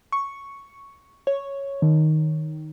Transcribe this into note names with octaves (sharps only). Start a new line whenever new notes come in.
C#6
C#5
D#3